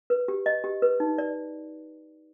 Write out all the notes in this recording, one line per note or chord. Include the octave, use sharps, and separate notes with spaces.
B4
G4
D#5
G4
B4
D#4
D5